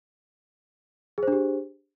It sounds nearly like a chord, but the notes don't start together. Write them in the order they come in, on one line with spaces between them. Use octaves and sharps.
G#4 C5 D4 G4